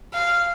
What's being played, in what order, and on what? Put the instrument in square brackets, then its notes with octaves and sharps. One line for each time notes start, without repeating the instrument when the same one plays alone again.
[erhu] F5